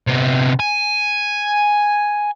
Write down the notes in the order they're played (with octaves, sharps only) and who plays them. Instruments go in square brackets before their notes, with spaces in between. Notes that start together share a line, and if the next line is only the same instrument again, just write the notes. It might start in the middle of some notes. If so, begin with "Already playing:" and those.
[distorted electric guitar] C3 B3
G#5